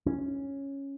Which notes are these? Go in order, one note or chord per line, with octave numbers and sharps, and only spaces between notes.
C#4